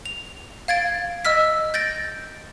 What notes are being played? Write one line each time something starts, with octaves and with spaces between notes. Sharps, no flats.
F7
F5 G#6 A6 D7
D#5 E6 F6 B6
G6 A6 A#6 D7